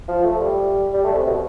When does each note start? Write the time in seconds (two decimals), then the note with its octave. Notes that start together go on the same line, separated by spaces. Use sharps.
0.09 F3
0.24 A3
0.40 G3
0.94 G3
1.04 A3
1.14 C3
1.26 B2